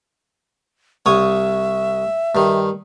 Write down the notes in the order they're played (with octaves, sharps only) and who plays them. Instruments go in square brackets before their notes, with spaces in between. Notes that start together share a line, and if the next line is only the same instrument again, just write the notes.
[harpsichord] C2 C#5 D#6 [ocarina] E5
[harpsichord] G2 D#3